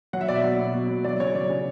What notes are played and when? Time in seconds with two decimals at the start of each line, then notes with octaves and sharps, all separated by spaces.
0.13 F#3 F#5
0.21 E5
0.29 B2 D5
0.35 E5
0.44 F#3
0.59 B2
0.74 F#3
0.89 B2
1.04 F#3 D5
1.20 C#3 C#5
1.35 F#3 D5
1.49 C#3